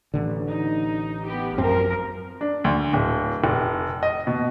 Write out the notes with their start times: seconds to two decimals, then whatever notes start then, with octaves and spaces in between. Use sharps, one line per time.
0.14 A1 D3
0.48 D#4
1.26 B3 G4
1.58 F#2 F3 C4 A#4
2.41 D4
2.64 D2
2.93 D1
3.44 F1
4.03 D#5
4.27 B2